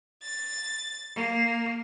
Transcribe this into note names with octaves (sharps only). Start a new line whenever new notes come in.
A6
A#3